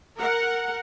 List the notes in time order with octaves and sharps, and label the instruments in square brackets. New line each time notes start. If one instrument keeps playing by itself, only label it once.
[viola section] A#4 F#5